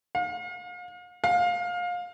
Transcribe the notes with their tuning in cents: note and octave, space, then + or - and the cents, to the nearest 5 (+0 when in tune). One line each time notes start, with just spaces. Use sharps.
F5 +40
F5 +25